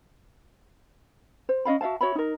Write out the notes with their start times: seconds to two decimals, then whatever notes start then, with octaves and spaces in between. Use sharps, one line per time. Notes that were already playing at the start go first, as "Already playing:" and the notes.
1.49 C5
1.65 C#4 D#5 F5 B5
1.81 F#4 E5 F5 A5
2.01 F#4 C#5 E5 B5
2.15 D#4 A#4